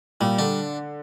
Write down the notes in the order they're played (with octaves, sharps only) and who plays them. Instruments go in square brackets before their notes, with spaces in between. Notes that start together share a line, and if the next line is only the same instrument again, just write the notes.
[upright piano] A#2 [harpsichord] G3
[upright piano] D3 [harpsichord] D4